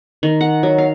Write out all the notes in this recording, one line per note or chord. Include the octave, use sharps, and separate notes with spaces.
D#3
F#5
F#3
F5